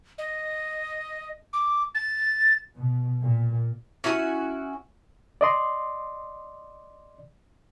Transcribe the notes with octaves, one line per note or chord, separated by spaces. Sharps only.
D#5
D6
A6
B2
A#2
C#4 E4 F#4 G#5
D5 D#5 C6